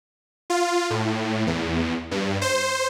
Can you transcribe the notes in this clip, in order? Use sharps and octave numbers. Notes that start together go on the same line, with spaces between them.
F4
A2
E2
G2
C5